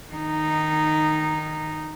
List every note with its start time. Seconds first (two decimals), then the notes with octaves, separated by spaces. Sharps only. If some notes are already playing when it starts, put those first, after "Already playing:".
0.11 D#3 D#4